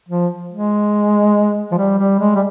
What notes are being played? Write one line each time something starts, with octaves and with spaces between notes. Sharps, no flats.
F3
G#3
F3
G3
G3
G#3
G3